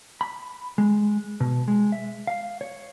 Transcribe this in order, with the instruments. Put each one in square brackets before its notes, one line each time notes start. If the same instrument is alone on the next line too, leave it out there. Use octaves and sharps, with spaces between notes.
[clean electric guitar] B5
G#3
B2
G#3
E5
F5
C#5